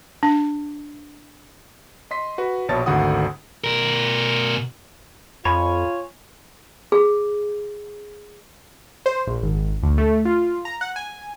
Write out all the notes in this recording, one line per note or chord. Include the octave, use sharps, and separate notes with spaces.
D4
D#5 C6 B6
F#4 B4
A#1 B2 C#5 A5 A6
G#1 D2 D3 F#4 F#5 D#6
B2 A#4
F2 F4 C#5 G#5 B5
G#4
C5
A#1
G#1
D2
A3
F4
A#5
F#5
G#5